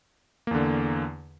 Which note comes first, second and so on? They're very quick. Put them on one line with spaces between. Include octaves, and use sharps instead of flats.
A#3 E2 D3